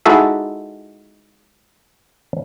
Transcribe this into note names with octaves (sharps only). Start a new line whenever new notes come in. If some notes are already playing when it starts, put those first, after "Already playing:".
G#3 D#4 E4 F#4 A4 E5